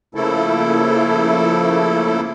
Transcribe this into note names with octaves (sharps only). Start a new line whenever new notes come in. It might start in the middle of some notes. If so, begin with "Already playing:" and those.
C#3 F3 A3 A#3 E4 A4